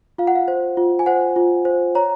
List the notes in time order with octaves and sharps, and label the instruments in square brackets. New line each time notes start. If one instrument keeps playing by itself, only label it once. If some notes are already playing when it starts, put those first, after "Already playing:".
[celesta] F4 F5
F#5
F5
C5
F4
G#5
C5 F#5
F4
C5
C#5 A#5